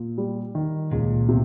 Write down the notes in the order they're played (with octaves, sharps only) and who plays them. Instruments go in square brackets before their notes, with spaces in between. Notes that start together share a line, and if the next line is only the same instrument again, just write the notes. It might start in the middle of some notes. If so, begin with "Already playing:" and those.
Already playing: [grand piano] A#2
G3
D#3
[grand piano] C#2 [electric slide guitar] A#2
[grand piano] C3